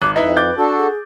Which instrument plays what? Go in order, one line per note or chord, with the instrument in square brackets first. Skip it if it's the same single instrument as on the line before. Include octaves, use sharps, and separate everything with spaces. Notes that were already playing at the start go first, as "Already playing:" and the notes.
[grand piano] G#1 F#6 [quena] D6
[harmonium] F2 [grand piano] D#4 E4 E5 [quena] B4
[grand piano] D6 G6 A6
[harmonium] D4 F#4 A4 [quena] A5
[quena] G#4